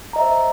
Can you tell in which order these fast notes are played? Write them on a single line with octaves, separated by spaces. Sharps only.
A#5 D#5 E5 C5